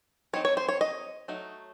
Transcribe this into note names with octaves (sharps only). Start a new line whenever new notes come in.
F#3 C4 D#4 C#5
C#5
C5
C#5
D#5
F#3 A3 D#4